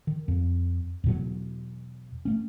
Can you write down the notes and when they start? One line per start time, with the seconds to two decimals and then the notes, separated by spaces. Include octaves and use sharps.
0.07 D#3
0.28 F2
1.04 E2 B2 F#3
2.25 A3 C#4